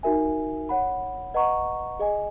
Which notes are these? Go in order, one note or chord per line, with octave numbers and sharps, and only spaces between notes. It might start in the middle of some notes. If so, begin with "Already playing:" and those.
D#4 F#4 A#4 E5 G#5
C#5 F#5 B5
B4 D#5 F#5 A#5 C#6
G#4 D#5 G#5